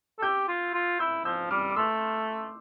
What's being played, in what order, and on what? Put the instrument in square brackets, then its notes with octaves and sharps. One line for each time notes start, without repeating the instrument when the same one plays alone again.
[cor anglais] A4
[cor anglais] G4 [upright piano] E6 G6
[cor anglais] F4
F4
[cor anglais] E4 [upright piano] E6 G6
[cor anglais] F3 [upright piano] E6 G6
[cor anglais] G3 [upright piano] D6 F6
[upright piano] D6
[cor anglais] A3 [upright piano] C6 E6